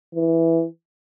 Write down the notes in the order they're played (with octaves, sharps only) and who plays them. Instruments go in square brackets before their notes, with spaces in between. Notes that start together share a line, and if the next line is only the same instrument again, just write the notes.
[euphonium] E3